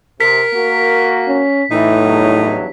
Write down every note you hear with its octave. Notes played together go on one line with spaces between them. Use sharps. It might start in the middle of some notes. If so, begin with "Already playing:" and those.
C3 A#4 B6
A#3 F#4
C#4
A2 E3 D#4
E2 G2 F#3